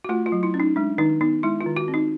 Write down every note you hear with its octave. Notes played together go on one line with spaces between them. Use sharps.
F#4
A3 F4
F4
F#3
E4
C#4
D#4
G#3 D4
D#3 D#4
B3 D#4
G#3 E4
F4
D#3
F#4
C4
D#4